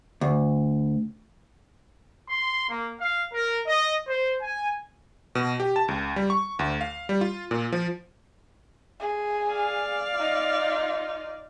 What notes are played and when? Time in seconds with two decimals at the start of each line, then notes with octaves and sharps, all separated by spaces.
0.21 D2
2.29 C6
2.68 A#3
2.98 F5
3.32 A#4
3.64 D#5
4.07 C5
4.41 G#5
5.35 B2
5.60 G4
5.76 A5
5.88 C#2
6.16 G3
6.30 C#6
6.59 D2
6.81 F5
7.09 G3
7.21 F4
7.51 A#2
7.72 F3
9.00 G#4
9.51 D5 F5
10.15 D#4 F4